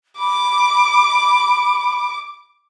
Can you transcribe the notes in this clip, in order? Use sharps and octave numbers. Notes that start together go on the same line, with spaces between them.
B5 D6